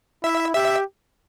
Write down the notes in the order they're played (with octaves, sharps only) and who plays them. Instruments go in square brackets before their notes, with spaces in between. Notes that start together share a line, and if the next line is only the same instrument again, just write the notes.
[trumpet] E4 [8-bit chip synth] E5
[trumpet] G4 [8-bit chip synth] E5